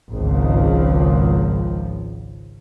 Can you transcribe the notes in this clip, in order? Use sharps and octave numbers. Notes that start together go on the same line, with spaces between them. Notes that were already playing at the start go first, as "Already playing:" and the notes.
G#1 C#2 F3